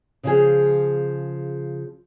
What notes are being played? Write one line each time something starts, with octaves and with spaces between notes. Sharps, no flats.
C#3 F3 G#4